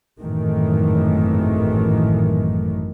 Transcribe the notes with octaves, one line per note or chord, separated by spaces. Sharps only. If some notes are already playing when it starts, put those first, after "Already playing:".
G#1 F#2 A2 D#3 E3 A3